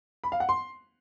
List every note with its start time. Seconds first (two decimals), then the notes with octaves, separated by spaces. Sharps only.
0.24 B5
0.32 F5
0.40 F#5
0.49 C6